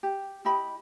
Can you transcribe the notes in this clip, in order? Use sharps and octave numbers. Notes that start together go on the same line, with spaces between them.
G4
E4 G4 D#5 B5